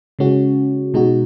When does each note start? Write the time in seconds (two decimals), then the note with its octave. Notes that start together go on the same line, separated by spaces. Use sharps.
0.19 C#3 G#3 C#4 F#4
0.94 B2 G#3 D#4 F#4